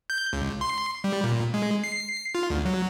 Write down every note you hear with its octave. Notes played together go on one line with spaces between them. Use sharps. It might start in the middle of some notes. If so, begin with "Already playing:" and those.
G6
C#2
C6
G3
A#2
G#3
C7
F4
D2
F#3